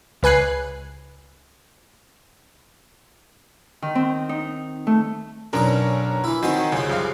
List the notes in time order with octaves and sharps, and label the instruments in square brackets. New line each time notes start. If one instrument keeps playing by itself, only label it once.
[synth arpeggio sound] C#2 B4 G#5 F#6 C7
[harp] D#3
C4
D#4
A3
[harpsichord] B1 F#2 A#5 [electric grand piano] C#4 D4 A#4
[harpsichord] E3 E4
[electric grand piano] D#3 C4 [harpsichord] F#3 G#5 C6
[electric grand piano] C2 [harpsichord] C#3 F3
[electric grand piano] F#2 G3 F5